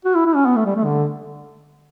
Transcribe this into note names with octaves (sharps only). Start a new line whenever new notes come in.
F#4
E4
E4
C#4
B3
A3
G3
A3
D3